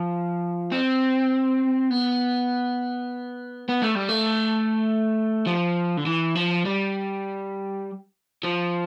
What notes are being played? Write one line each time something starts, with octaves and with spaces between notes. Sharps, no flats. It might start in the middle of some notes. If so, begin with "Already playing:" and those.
Already playing: F3
C4
B3
B3
A3
G3
A3
F3
D3
E3
F3
G3
F3